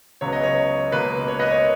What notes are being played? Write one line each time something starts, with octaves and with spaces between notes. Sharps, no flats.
C#2 C#3 F#3 B3 C#5
D#5
C#5
C#2 B2 A#3 B4
C#5
B4 D#5
C#5